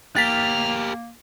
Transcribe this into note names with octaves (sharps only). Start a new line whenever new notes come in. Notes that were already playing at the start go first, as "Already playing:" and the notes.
A#3 G4 A#4 F6 A6 B6